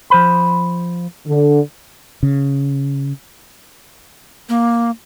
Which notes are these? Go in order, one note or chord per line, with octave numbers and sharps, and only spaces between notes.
F3 C5 B5
D3
C#3
A#3